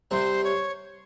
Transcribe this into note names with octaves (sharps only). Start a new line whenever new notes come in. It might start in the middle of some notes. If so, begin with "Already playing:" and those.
C2 C3 C5
C#5